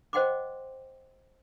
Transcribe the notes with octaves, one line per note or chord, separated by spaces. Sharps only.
C5 D#5 F#5 G5 C6 D6